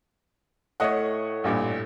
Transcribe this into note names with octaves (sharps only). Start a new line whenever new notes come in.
A2 A3 C#5 D#5 F#5
A1 G2 A#2